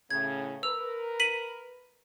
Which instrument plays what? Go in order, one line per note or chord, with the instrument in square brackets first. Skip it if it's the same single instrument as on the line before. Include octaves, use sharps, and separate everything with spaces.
[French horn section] A2 C#3 [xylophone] G#6
[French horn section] A#4 B4 [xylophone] E6 F7
[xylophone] B6 D#7 F#7